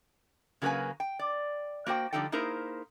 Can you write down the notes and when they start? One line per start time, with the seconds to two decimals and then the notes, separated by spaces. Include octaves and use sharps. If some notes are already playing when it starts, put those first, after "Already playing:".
0.62 C#3 F#3 A#3 F#4 B4 G#5
1.00 G5
1.19 D5
1.87 A#3 F#4 C5 G5
2.13 D3 F3 G3 D#4 A4 G5
2.32 A#3 D#4 E4 G#4 A#4 C5